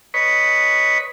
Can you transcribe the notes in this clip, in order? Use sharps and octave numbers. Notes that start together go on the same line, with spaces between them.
B4 C#5 D#5 B5 C#6